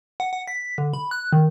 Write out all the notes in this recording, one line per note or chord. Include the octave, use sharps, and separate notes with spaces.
F#5
F#5
B6
D3
B5
F#6
D#3